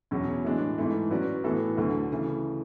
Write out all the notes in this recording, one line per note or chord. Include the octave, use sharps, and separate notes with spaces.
E2 B2 F#3 C#4 G#4
A2 E3 G#3 D4 F#4
G#2 E3 A3
F#3 C#4 F#4 B4 D5
A2 E3 B3 F#4 A4
D2 D3 F#3 A3
C#3 E3 A3